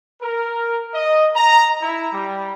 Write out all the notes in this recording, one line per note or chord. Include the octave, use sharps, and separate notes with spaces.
A#4
D#5
A#5
E4
G3